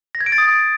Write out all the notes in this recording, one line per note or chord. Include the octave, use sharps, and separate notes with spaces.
A#6
G#6
D7
A6
D#6